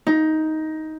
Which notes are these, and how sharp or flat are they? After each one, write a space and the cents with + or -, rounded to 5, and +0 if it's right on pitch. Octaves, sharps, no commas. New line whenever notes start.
D#4 +10